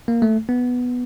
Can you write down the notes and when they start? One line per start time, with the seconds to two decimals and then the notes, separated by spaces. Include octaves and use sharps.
0.08 A#3
0.22 A3
0.49 B3